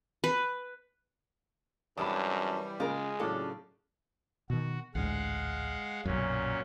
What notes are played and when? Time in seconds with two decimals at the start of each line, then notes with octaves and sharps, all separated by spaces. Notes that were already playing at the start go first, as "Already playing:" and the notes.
0.24 B4
1.97 F#2 C3 E3 G3 G#3 D4 B5 D#6
2.80 C#3 G#3 F4 A#4
3.20 A2 C#3 F#3 D4 F4 A4
4.50 B2 D#3 F#4
4.95 A1 D2 G#2 G#3 F5 F#5
6.05 B1 F#2 A#2 F#3 C#4